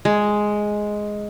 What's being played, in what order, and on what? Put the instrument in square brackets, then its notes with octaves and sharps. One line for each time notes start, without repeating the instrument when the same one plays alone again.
[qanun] G#3